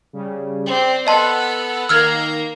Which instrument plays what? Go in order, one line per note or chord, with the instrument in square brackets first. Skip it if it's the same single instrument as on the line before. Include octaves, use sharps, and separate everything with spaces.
[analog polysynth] C#3 G3
[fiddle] C4 [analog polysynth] D5
[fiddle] B3 A4 [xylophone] D#5 A5 C6 [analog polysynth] F#5 E6 F#6
[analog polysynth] D#3 [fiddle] A#3 A#4 [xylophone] E6 F6 G#6